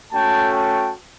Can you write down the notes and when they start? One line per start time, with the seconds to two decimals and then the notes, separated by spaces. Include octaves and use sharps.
0.12 A3 C#4 F#4 G5 A5
0.53 G5 A5